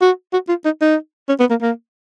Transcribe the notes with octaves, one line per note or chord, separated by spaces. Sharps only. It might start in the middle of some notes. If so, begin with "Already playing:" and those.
F#4
F#4
F4
D#4
D#4
C#4
B3
A#3
A#3